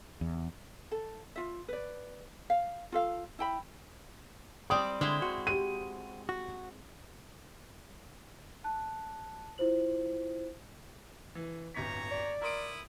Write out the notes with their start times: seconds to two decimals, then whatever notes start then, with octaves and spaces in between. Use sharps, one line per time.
0.21 E2
0.91 A4
1.36 F4 E5
1.68 B4 D5
2.50 F5
2.92 F4 A4 F5
3.39 E4 G5 B5
4.70 G3 C4 D5 D#6
5.01 D3 G#3 E4 C5
5.22 F#4
5.47 G4 D#7
6.29 F#4
8.64 A5 F#6
9.58 E4 F4 C5 F#7
11.35 E3
11.74 D1 G1 C#5 A#5 B6
12.11 D5
12.42 E4 A#4 C6 D#6 D7